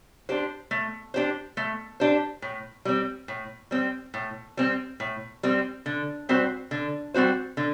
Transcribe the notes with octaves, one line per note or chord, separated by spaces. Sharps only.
D4 G4 C5
A3
D4 G4 C5
A3
D4 G4 C5
A2
G3 C4
A2
G3 C4
A2
G3 C4
A2
G3 C4
D3
G3 C4 F#4 C5
D3
G3 C4 F#4 C5
D3